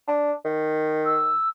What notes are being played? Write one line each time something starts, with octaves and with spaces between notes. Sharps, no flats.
D4
D#3
E6